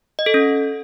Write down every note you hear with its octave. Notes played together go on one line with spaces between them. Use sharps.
D#5
A4
C#4